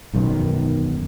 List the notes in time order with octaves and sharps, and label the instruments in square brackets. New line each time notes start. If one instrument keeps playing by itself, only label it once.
[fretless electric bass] E1 B1 F#2 D#3